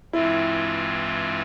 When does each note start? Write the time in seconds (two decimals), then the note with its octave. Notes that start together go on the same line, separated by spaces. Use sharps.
0.13 G2 E3 G#3 C4 E4 F4